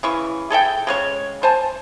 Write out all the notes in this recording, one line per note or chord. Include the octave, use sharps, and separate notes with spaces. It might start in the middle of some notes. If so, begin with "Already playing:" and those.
C#3 E3 C#6
G#4 A4 E5 G5
C#3 G#3 C#5
C5 G#5 A5